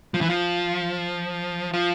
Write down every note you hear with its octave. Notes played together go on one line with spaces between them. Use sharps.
F3
E3
F3
F3